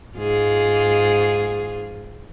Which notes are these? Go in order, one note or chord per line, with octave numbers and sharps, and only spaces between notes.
G#2 F4 G#4